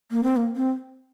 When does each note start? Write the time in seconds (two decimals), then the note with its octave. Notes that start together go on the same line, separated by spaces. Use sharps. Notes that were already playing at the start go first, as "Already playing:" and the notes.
0.11 A#3
0.23 C4
0.36 A#3
0.56 C4